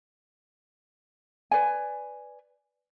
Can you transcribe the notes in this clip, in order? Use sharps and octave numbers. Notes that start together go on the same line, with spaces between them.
B4 D5 G#5